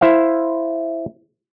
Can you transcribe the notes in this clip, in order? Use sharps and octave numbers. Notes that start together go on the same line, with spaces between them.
E4 C5 E5 F5